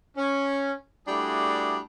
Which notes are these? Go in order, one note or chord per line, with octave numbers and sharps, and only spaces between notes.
C#4
G3 A3 D4 E4 F#4 G#4